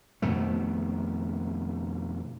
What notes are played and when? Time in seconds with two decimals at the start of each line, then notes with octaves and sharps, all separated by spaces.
0.22 F2 B2 D#3 A3